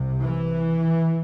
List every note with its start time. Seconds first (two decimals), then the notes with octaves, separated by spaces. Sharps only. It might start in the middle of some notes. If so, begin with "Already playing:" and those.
Already playing: C2 C3
0.22 E3